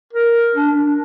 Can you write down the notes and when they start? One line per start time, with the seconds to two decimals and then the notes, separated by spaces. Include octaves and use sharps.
0.13 A#4
0.55 D4